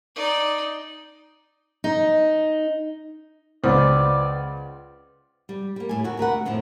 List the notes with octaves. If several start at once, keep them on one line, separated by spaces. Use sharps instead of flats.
D#4 D5
D#4
C#2 B4 C5 D5 F#5 F6
G3
G3 A#3
A2 G#5
D#2 F#4
D2 A#4 B4 F#5
F2 A2 D#3 F3